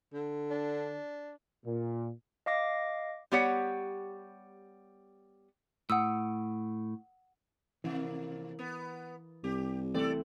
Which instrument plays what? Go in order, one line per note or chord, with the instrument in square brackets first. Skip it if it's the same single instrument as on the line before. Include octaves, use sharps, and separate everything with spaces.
[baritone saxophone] D3
[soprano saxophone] D4
[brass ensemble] A#2
[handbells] D#5 F5 D6 A#6
[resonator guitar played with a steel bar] G3 B3 G4 C#5 F#5
[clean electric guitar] A2 [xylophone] F#5 D#6 E6
[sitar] F2 C3 A#3 [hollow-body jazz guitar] E3
[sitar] B3
[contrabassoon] C2 [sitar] G4
[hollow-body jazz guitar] E3 A3 C4 [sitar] A4 D5